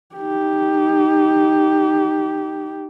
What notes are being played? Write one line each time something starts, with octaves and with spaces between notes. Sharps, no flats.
D#4 G4